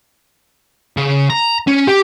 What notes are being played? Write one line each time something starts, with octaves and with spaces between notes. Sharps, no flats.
C#3
A#5
C#4
G4